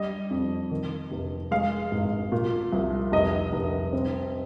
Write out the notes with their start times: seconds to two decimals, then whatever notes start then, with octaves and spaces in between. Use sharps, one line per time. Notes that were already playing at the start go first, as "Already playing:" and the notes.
Already playing: G3 D#5
0.30 F2
0.71 D#3
1.12 F1
1.51 G#3 F5
1.92 G#1
2.32 A#2
2.72 C2
3.12 F1 D#5
3.52 F1
3.93 C4